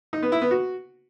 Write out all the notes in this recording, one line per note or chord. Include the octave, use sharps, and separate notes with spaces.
D#4
B3
E4
B3
F#4